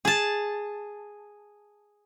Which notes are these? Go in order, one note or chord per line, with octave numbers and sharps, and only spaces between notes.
G#4 A5